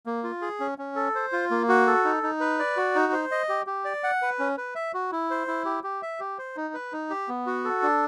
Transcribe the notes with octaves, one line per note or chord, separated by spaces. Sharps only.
A#3
F4
G#4
C#4
C#4
A4
C5
F4
A#3
F#4
A4
D#4
D#4
B4
D5
F#4
D#4
C5
D#5
G4
G4
D5
F#5
B4
C#4
B4
E5
F#4
E4
C5
E4
G4
G4
E5
G4
C5
D#4
B4
D#4
G4
B3
F#4
A4
D4